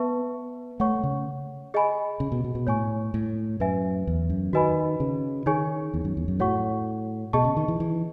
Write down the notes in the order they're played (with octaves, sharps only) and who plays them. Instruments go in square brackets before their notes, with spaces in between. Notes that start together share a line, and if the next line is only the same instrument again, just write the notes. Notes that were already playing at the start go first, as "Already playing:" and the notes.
Already playing: [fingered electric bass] B3 [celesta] B4 E5 A5 C#6
[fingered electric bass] A3 [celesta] C#5 F#5 C#6
[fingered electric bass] C#3
[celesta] G#4 D#5 G#5 B5
[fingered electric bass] C#3
B2
B2
B2
[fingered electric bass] A2 [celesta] C#5 G#5 C#6
[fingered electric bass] A2
[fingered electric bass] F#2 [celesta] B4 E5 G#5
[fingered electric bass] E2
F#2
[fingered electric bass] D#3 [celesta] F#4 B4 D#5 G#5 B5
[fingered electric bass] C#3
[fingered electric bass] D#3 [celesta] D#4 G#4 C#5 G#5 C#6
[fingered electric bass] E2
F#2
E2
F#2
[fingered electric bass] A2 [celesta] F#4 C#5 F#5 C#6
[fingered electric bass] B2 [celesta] G#4 D#5 A5 C#6
[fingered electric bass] C#3
D#3
E3
E3